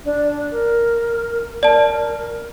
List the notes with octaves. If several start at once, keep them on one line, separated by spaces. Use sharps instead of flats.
D4
A#4
A#4 D5 A5